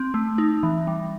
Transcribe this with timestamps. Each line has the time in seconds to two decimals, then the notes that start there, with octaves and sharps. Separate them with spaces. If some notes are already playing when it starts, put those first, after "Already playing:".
Already playing: C4
0.14 A3
0.38 D#4
0.63 E3
0.87 G3